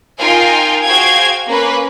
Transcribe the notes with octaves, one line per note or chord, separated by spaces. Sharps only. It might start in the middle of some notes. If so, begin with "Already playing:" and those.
D#4 F4 A#4 F5 G5 G#5
F#4 G#4 C5 F5 G5 G#6
A#3 C#4 B4